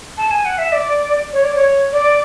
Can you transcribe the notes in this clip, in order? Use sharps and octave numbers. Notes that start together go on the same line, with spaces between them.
A5
G#5
F#5
E5
D5
C#5
D5
C#5
D5